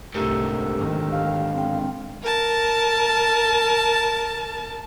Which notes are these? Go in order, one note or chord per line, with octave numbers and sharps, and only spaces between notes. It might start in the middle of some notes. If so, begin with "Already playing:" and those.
C2 G#2 D3 A3 G4 A#4 E6
D#3
F5
C4 G5
A#4 A5